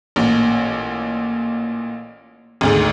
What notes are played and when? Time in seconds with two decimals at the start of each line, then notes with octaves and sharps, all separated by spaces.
0.16 A1 A#2
2.61 G#1 D2 G#2